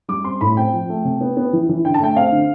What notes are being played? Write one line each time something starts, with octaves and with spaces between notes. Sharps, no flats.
G3 D6
C4 C6
A2 B5
C4 G5
F3
A3
C3
B3
B3
E3
E3
D3 G5
A5
A3 G5
C4 F5
D3